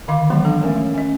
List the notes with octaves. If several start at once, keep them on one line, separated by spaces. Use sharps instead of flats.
D3 D#3 D#5 F5 B5 D6
E3 F#3 G#3 B3 F5 B5
D4 A4 F5
A3 C#4 A#4 C#5
A3
C#4 D#5